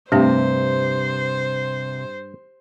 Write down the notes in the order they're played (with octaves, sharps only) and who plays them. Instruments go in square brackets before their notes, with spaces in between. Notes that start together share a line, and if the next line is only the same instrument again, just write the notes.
[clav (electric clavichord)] G2 [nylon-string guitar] C3 [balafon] A3 D4 G4 [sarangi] C5